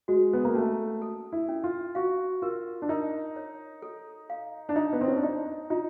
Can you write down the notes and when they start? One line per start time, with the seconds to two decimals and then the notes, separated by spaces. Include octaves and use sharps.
0.08 G#3 F#4
0.33 B3
0.45 A#3
0.55 A3 C#4
1.02 A4
1.32 E4
1.49 C#4
1.64 F4
1.95 F#4 F5
2.42 F4 A#4
2.82 D4
2.89 D#4 A#4
3.36 C#5
3.82 A4
4.30 F5
4.69 D4
4.76 D#4 D5
4.93 B3
5.01 C4
5.08 C#4
5.16 D4
5.23 D#4 D5
5.70 D#4 F4